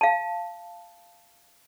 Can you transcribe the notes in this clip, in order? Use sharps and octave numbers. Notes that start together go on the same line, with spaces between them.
F5 A5